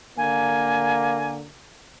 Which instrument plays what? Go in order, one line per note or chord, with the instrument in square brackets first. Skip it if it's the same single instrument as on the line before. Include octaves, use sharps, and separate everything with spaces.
[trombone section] D3 A#3 [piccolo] G#5